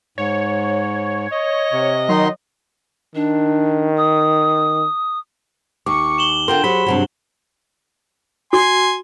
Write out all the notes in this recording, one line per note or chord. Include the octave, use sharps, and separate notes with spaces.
G#2 C#5
D#5
C3
D#3 F#3 D#4 C6
D#3 D4
D#6
D#2 C#6 D6
E7 F#7 G7
D3 F4 A#4 G5 C6
F#3 G4 G#4 C5 B5
G2 C3 F#3
F#4 G#5 C6